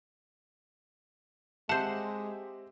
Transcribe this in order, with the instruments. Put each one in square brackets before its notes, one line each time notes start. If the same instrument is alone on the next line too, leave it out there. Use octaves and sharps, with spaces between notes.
[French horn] G#3 [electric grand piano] C4 G4 E5 [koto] C5 F#5 [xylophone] A5